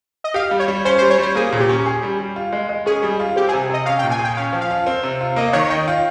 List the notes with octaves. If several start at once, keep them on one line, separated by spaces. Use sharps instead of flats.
D#5
G4 F5
G3
C#5
G3
C#4 C5
C5
G3
C#5
G3 C5
A#3 G#4
A#2
G4
C#4
G#4
G3
G3
F4
G#3
G#3
C#4 G#4
G3
F4
C4 G4
G#4
C3
C3 D#5
C#4 F5
G5
A#2
G#5
G#4
G5
C#4 F5
F3
F5
F4
C4
C3
F4
A#3 D#5
D#3 C#5
D#4 G5
F4